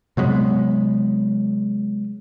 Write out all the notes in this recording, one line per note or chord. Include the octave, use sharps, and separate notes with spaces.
C3 F#3 G#3 B3